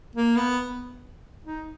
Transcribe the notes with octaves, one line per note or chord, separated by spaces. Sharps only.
A#3
B3
D#4